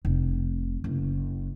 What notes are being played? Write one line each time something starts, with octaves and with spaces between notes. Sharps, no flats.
F1
F#1